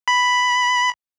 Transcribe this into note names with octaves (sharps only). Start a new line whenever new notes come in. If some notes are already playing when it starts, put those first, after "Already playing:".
B5